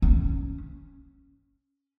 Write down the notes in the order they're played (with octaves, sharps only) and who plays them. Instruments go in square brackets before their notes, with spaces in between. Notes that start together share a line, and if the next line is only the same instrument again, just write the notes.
[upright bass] C#4